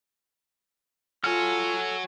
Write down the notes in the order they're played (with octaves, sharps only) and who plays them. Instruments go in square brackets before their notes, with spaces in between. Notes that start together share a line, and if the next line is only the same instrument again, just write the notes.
[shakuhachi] F4 [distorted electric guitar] F#4 C#5 [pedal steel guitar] A4 F6 [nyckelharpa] G#5